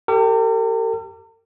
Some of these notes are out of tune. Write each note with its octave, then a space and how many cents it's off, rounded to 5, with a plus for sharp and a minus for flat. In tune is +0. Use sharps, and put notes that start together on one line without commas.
G4 -5 A#4 -45